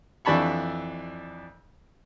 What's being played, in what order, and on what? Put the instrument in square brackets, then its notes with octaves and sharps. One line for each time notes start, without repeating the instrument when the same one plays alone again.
[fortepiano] F2 E3 D4 A5 B5 C#6